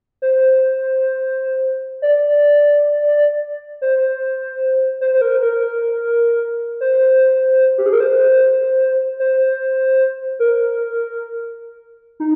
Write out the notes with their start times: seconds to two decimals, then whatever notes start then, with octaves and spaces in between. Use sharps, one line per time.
0.22 C5
2.02 D5
3.82 C5
5.01 C5
5.14 C5
5.21 A#4
5.41 A#4
6.81 C5
7.78 G4
7.86 G#4
7.93 A#4
8.00 C5
9.20 C5
10.39 A#4
12.20 D#4